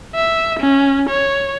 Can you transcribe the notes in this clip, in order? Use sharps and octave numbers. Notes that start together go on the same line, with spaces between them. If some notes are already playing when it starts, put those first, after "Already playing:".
E5
C#4
C#5